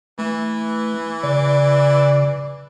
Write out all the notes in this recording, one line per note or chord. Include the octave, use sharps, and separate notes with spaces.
E3 A3
C#3 D5